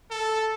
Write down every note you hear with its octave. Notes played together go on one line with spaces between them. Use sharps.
A4